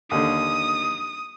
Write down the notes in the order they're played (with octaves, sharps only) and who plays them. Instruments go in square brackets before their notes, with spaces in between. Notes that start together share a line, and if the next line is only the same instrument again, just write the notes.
[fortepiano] D#2 D3 [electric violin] D#6